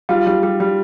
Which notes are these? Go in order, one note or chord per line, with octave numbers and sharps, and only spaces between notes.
G3 F4
G3
G3
G3